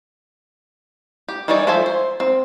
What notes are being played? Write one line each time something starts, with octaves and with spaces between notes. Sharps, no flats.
G4
E3 G3 D#4 C#5 D5
F3 A4 C5 E5 G#5
C5
C4